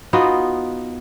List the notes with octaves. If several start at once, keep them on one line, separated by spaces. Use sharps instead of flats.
B3 D#4 F4 F#4